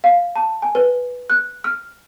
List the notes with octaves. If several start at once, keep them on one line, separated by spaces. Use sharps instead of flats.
F5
A5
G#5
B4
F#6
F6